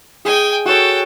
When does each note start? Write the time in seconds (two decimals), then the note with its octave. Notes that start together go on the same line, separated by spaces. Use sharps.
0.25 G#4 D#5 G5 G#5
0.66 F#4 A4 C#5 G5